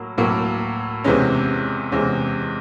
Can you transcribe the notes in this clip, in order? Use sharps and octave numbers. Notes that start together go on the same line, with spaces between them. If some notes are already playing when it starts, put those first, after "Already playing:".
Already playing: A2 F#3 A#3
A2 F#3 A#3
E2 C3 E3 G#3 C#4
E2 C3 E3 G#3 C#4